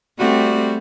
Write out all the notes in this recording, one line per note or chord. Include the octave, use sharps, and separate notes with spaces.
G3 A3 C4 F#4